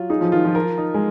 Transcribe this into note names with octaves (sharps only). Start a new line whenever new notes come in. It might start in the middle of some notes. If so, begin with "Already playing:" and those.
Already playing: F#3 F4
D#4 G#4
F3
D#3 F4
F3
A#4
D#4
G#3